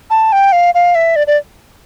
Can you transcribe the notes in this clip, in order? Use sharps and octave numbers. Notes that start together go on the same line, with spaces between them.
A5
G5
F5
F5
E5
D5
D5